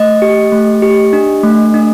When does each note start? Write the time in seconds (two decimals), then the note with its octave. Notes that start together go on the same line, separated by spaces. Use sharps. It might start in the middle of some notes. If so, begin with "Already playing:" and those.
Already playing: A3 D#5
0.22 G4
0.52 A3
0.82 G4
1.13 D4
1.43 A3
1.74 D4